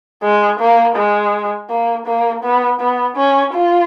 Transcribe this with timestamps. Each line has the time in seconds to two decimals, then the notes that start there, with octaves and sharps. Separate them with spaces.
0.23 G#3
0.60 A#3
0.96 G#3
1.70 A#3
2.07 A#3
2.44 B3
2.80 B3
3.17 C#4
3.53 F4